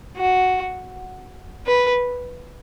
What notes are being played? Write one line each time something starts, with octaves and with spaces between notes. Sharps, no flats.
F#4
B4